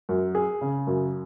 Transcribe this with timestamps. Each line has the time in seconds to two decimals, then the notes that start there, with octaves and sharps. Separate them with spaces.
0.09 F#2
0.35 G#4
0.61 C#3
0.87 F#2